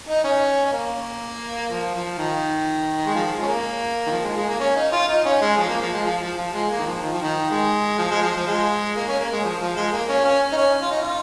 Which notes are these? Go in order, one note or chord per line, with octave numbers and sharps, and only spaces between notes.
D#4
C#4
C#4
A#3
F3
F3
D#3
G#3
F3
G#3
C#4
A#3
D#3
F3
G#3
G#3
A#3
C#4
D#4
F4
D#4
C#4
G#3
F3
A#3
F3
G#3
F3
F3
F3
G#3
A#3
D#3
F3
D#3
F3
D#3
G#3
F3
G#3
F3
F3
G#3
A#3
C#4
A#3
G#3
F3
F3
G#3
A#3
C#4
C#4
D#4
C#4
F4
D#4
F4